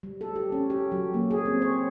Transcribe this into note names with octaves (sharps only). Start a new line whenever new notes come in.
G3
A4
G4
C#4
G4
F#3
A#3
G#4
C4
C#5